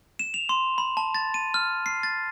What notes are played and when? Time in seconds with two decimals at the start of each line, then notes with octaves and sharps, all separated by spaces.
0.19 E7
0.34 F7
0.49 C6
0.78 B5
0.97 A5
1.15 A6
1.34 D#7
1.54 F6
1.86 C7
2.03 A6